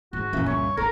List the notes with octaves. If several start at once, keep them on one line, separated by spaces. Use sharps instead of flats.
G#2 D3 F#4
F#1 A#2 E3 C#4 E5
C#2 G2 C#5
G#1 D#2 A4 A#4